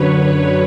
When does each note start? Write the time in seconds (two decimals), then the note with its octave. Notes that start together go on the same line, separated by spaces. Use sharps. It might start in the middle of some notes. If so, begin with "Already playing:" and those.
Already playing: F#2 D3 F#3 B4 C#5
0.14 C#5